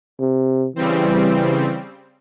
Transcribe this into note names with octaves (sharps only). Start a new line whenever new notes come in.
C3
C#3 E3 G3 C4